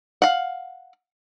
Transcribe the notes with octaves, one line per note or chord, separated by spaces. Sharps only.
F5 F#5